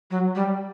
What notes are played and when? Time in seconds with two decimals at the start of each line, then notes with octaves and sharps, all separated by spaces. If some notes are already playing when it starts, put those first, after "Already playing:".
0.11 F#3
0.35 G3